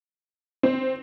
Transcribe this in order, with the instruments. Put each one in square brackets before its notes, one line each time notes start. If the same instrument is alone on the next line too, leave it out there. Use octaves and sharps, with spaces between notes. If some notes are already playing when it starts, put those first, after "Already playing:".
[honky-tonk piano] C4